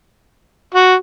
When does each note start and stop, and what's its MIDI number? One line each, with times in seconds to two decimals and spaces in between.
0.74 0.94 66